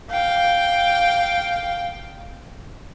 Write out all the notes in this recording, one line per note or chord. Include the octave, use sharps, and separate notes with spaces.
F5 G5